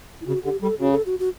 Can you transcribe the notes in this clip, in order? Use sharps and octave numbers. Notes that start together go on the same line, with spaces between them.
E4
C#3 F#4
D3 G4
G3 A4
C#3 F#4
A4
F#4
F#4